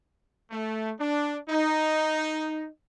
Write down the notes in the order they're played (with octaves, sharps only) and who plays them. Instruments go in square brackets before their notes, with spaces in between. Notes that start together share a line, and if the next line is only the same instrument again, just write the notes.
[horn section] A3
D4
D#4